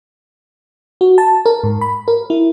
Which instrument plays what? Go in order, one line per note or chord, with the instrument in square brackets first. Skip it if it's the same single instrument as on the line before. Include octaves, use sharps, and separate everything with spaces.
[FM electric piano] F#4
A5
A#4
G#2
B5
A#4
E4